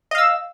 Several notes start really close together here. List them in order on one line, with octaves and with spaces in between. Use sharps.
D#5 F5 E6